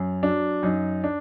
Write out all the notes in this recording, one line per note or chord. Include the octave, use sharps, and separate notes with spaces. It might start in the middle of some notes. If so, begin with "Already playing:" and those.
Already playing: F#2
F#3 D4
F#2 D#4
D4